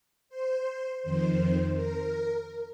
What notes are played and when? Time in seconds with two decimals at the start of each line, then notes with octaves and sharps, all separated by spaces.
0.29 C5
1.02 F2 D#3 C5
1.75 A#4